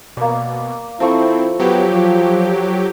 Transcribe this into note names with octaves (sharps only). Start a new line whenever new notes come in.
B2 A#3 D5
F3 C4 E4 A4 C#6
F#3 B3 G4 G5
F3